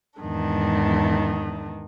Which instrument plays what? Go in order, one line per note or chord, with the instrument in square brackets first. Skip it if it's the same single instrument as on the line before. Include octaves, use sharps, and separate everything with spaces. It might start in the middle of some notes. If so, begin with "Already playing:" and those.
[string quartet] E2 G#2 D#3 D4